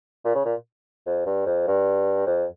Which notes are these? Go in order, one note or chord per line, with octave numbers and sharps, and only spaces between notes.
A#2
C#3
A#2
F2
G2
F2
G2
F2